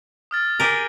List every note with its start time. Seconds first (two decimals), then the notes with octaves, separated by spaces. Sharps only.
0.31 D#6 F6 A6
0.60 G4 G#4 A#4 A6 D#7